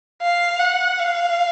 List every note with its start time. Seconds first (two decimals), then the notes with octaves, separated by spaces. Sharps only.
0.22 F5
0.60 F#5
0.99 F5